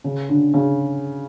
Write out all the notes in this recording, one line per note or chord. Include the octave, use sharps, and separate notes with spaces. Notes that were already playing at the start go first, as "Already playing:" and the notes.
C#3
D3
C#3